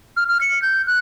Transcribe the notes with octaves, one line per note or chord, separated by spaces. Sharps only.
F6
F6
C#7
G6
F#6